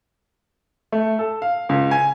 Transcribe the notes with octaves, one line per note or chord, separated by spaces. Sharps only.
A3
A4
F5
C#2
G#5